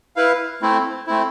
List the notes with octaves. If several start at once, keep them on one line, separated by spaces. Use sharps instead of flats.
E4 B4 F5
A3 C4 E4
A3 C4 E4